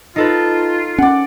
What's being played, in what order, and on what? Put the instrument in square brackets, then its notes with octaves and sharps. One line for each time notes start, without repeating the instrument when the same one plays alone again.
[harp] D#4 A4 B4 [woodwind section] F4
[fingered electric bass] C#4 [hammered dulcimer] D5 F#5